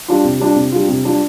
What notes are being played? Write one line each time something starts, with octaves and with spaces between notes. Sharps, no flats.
G3 D4 F4
C3
G3 D4 F4
C3
G3 D4 F4
C3
G3 D4 F4